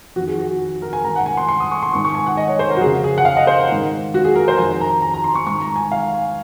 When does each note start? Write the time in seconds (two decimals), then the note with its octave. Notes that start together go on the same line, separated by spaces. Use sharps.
0.16 F2 D#3 F#4
0.28 G#4
0.38 F#4
0.82 A#4
0.93 G#5
1.04 G#2 D#3 A#5
1.16 F#5
1.26 G#5
1.37 C6
1.49 C6
1.60 D#6
1.71 C#6
1.83 C6
1.93 G#2 D#3 C#6
2.05 C#6
2.15 G#5
2.27 F#5
2.37 D#5
2.48 C#5
2.59 C5
2.71 A#4
2.77 F#4
2.81 F2 G#4
2.86 C#3
3.04 G#4
3.18 F#5
3.25 F5
3.37 D#5
3.47 C5
3.59 A#4
3.69 G#2 D#3
4.14 F#4
4.25 G#4
4.36 A#4
4.48 C5
4.58 F2 G#5
4.63 D#3
4.81 A#5
5.02 A#5
5.14 A#5
5.24 C6
5.35 C#6
5.47 G#2 D#3 C#6
5.62 A#5
5.76 G#5
5.92 F5